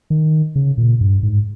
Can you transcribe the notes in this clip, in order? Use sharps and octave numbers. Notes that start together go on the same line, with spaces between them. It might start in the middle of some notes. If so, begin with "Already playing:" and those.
D#3
C#3
A#2
G2
G#2